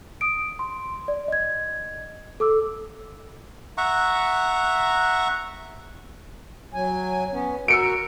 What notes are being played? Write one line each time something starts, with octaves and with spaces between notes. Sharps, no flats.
D#6 D7
C6
D5
D#5 G#6
A4 D6 E6
E5 F#5 A#5 C#6
F#3 G#5
B3 C#4
F#4 A#4 E6 C#7 D7